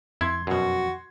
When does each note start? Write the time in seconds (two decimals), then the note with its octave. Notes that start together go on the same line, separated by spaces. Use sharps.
0.21 F2 E4 C6 G#6
0.47 F#2 B2 F#4